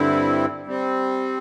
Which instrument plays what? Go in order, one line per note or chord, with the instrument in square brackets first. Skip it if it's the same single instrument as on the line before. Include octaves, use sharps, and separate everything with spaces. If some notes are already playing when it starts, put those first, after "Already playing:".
Already playing: [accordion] G2 D3 G3 C4 E4
G3 C4